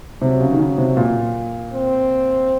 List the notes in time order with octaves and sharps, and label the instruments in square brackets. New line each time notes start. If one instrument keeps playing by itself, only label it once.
[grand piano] C3 [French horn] F#3
[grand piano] C#3
D#3
C#3
C3
A#2
[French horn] C4